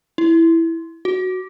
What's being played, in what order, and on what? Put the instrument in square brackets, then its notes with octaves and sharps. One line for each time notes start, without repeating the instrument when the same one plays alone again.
[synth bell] E4
F#4